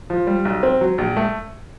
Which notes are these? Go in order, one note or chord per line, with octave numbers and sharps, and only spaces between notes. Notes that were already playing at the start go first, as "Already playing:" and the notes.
F3
G3
B1
C4
F#3
A#1
A3